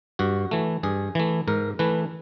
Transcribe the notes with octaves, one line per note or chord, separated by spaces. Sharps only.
G2 F#4
E3 A3
G2 G#4
E3 A3
G#2 A#4
E3 A3 B4